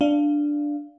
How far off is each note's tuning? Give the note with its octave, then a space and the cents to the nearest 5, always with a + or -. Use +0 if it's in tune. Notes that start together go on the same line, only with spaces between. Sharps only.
D4 +0 F5 -15